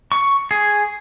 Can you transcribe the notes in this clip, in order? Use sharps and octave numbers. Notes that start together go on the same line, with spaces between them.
C#6
G#4